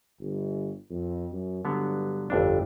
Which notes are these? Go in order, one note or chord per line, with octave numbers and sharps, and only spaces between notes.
G1
F2
F#2
G2 D3 F#3 B3
G1 F2 D4